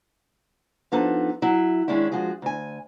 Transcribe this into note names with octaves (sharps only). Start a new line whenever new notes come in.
F3 B3 D4 D#4 A4
F#3 E4 E5
D#3 G#3 C#4 D4 E4
F3 G#3 F#4 G#4
D2 G#5